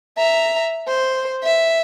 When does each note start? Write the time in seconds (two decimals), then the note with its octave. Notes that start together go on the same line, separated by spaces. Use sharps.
0.18 E5 A#5
0.88 C5
1.43 E5